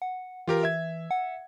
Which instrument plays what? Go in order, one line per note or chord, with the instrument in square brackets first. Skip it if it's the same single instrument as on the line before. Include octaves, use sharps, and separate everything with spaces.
[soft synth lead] F#5
[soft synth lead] E3 [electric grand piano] F4 G4 A#4
[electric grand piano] E5 G#6
[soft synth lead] F#5